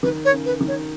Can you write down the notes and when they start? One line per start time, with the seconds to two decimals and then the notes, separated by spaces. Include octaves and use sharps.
0.03 D#3 B4
0.25 C#5
0.32 C#3
0.46 B4
0.61 D#3
0.68 C#5